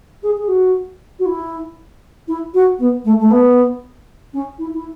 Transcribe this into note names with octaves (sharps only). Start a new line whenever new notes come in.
G#4
G#4
F#4
F#4
E4
E4
F#4
B3
A3
A3
B3
C#4
E4
E4